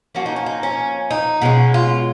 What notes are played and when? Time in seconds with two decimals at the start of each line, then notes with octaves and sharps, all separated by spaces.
0.15 F3 A#3 C#4 F#4
0.26 D#4
0.36 C#4
0.46 D#4
0.63 C#4
1.11 D#4
1.42 B2 G#3 C#4
1.74 F4